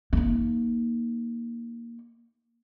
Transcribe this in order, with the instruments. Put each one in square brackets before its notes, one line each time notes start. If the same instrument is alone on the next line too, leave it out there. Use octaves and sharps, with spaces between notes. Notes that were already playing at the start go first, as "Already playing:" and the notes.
[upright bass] A#3 D#4